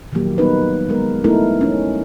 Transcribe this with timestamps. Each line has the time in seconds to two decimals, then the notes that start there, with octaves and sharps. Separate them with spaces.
0.12 A#2 D#3 F3 F#3 A#3 G4
0.38 G3 B3 D#4 A#4 B4
0.89 G#3 B3 A#4
1.24 A3 B3 D#4 E4 A4 A#4
1.61 C#4 D#4